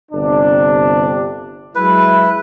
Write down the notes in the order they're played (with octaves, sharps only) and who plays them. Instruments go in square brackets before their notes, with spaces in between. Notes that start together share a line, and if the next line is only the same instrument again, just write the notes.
[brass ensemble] G1 C3 D4
[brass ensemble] F#3 G#3 E4 [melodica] B4